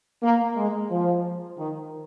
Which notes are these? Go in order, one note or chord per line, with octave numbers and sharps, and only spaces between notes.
A#3
G#3
F3
D#3